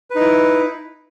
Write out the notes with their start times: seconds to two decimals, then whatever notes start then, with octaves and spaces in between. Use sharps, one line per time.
0.10 B4
0.15 D#4
0.20 E4